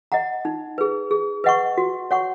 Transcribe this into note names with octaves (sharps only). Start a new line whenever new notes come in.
D#5 F#5 A#5
D#4
G#4 B4
G#4
B4 D#5 F#5 C#6
F#4
C#5 F#5 C#6